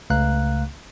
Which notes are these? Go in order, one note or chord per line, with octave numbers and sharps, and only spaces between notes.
C#2 C#3 A3 F5 A#5 F#6